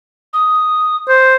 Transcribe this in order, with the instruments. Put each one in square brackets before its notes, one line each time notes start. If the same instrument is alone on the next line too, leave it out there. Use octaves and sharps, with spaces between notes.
[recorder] D#6
[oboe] C5